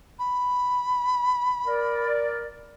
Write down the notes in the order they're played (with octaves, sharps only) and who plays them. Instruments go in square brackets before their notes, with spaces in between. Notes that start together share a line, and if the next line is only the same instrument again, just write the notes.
[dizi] B5
[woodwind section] A#4 D5